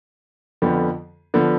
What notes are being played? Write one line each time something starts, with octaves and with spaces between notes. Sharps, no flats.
F2 D3 F3 B3
D3 F3 B3